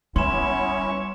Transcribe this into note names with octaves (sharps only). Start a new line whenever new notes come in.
G3 B3 C#4 E4 C#5 C6 E7